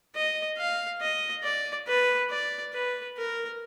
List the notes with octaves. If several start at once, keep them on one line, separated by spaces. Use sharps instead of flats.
D#5
F5
D#5
D5
B4
D5
B4
A#4